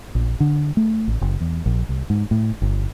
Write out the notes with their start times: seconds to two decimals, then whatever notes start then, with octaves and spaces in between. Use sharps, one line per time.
0.15 A#1
0.40 D3
0.77 A3
1.07 A1
1.21 F#1
1.41 E2
1.66 A#1
1.89 C2
2.10 G#2
2.31 A2
2.62 G1